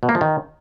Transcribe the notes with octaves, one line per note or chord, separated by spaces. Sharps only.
B2
A#3
F3
D#3